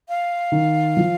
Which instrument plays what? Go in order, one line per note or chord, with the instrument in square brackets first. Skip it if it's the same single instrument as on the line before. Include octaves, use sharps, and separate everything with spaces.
[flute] F5
[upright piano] D#3
F3